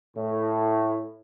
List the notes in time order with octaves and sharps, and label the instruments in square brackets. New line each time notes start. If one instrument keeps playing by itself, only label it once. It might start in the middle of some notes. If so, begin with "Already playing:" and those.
[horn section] A2